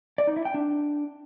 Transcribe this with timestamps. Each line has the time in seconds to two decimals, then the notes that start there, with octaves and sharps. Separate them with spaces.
0.18 D5
0.27 D#4
0.36 E4
0.45 G5
0.54 D4